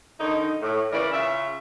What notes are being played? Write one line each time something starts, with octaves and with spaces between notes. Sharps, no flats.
D3 D#3 D#4
A2
C#3 E3 A#4 D5
C#3 F4 E5